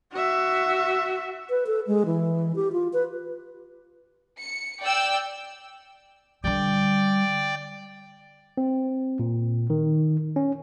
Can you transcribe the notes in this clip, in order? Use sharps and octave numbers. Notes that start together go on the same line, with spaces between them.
F#4 E5
B4
A4
G#3
E3
G4
F4
B4
C#7
D5 G5 E6
D3 G3 D5 G5
C4
A#2
D#3
C#4